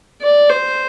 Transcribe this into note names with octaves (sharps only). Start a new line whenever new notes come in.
D5
C5